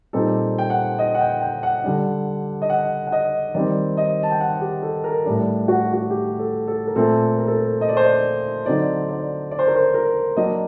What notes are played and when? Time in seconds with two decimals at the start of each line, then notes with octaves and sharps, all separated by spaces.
0.13 A#2 G3 C4 D#4 A4
0.58 G5
0.70 F#5
0.99 D#5
1.14 F#5
1.20 G5
1.41 G5
1.63 F#5
1.84 D3 G3 D4
2.62 D#5
2.70 F#5
3.07 F#5
3.12 D#5
3.54 D#3 G3 C4 D5
3.97 D#5
4.23 A5
4.31 G5
4.40 F#5
4.61 G4
4.82 A4
5.04 A#4
5.25 A2 G3 D4
5.68 F#4
5.93 F#4
6.11 G4
6.39 A4
6.68 A4
6.87 A#4
6.96 A#2 A3 C4 A4
7.38 A#4
7.48 A4
7.56 A#4
7.81 D#5
7.89 D5
7.97 C5
8.05 D5
8.66 D3 F#3 C4 D#4 D5
9.09 D5
9.51 D5
9.59 C5
9.67 A#4
9.75 C5
9.94 A#4
10.37 F#3 A#3 D4 D#5